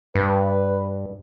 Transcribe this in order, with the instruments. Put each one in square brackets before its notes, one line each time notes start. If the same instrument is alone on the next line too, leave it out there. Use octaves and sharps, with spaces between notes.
[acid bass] G2 [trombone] B4